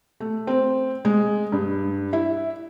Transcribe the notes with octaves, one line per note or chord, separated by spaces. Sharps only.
A3
C4
G#3
G2
E4